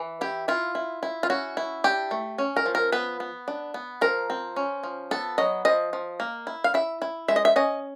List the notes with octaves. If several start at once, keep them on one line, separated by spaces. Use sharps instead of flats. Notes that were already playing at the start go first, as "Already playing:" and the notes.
Already playing: E3
E4 G4
E4 F4
E4
E4
F4
C#4 F#4
E4
D4 G4
A3
C#4
A#4
F3
A#4
B3 B4
B3
D4
B3
F3 A#4
C4
C#4
F3
B3 A4
F#3 D#5
F3 D#5
F3
A#3
E4
F5
E4 E5
E4
G#3 E5
D#5
E5
C#4 D#5